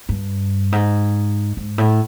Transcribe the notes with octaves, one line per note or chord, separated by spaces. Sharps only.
G2
G#2
G#2
A2